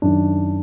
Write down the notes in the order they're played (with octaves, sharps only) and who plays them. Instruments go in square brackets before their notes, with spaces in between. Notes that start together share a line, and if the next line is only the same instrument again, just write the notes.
[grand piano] F#2 D#3 D4